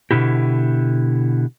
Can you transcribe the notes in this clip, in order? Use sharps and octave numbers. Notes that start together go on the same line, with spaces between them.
B2 D3 E4 G4